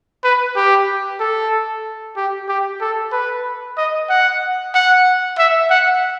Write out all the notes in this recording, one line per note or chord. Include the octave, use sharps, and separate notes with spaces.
B4
G4
A4
G4
G4
A4
B4
D#5
F#5
F#5
E5
F#5